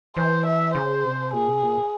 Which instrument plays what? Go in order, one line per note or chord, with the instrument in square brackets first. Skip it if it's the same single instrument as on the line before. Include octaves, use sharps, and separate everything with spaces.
[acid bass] E3 [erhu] C5
[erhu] E5
[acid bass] C#3 [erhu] C5
[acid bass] C3
[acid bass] A#2 [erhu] G#4
[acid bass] C3
A#2